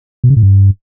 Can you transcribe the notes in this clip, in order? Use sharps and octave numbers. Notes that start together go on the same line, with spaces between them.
B2
C#3
A2
G2